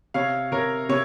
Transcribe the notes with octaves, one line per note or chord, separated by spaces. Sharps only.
C3 C#5 F5
C3 A#4 C#5
C3 C#5